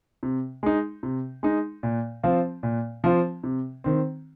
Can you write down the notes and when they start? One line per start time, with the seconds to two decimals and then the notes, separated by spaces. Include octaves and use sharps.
0.23 C3
0.63 G#3 D#4
1.03 C3
1.43 G#3 D#4
1.83 A#2
2.23 F3 C4 F4
2.63 A#2
3.04 F3 C4 F4
3.44 C3
3.84 D#3 C4